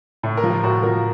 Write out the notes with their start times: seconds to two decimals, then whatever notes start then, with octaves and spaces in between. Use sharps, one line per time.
0.23 A2
0.37 A#4
0.44 F3
0.50 F4
0.63 A2 F#4
0.83 F3 A#4